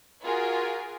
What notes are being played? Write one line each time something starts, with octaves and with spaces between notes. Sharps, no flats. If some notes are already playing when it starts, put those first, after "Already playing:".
F4 F#4 G#4 A#4